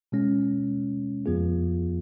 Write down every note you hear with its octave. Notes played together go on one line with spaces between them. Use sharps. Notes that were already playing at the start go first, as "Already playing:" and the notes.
B2 G#3 C#4
F2 F3 B3 F4 G#4